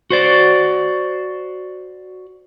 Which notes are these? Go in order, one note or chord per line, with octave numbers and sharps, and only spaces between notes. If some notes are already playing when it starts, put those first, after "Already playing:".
F#4 C5 D5